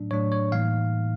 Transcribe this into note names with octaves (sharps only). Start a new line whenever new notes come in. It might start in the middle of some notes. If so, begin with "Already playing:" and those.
Already playing: A2 F#3 A3 D4
A2 F#3 A3 D4 C#5
C#5
A2 E3 G3 A#3 D#4 F5